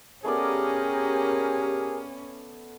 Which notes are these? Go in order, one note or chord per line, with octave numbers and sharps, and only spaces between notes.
A3 B3 C#4 G4 G#4 A#4 D5